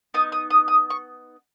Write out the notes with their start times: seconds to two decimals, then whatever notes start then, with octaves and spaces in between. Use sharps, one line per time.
0.14 B3 D#4 D#6
0.32 D#6
0.50 D#6
0.68 D#6
0.90 C#6